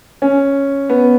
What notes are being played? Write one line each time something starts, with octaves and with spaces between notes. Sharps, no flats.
C#4
B3